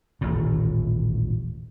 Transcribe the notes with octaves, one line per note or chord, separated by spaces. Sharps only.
D#1 A1 A2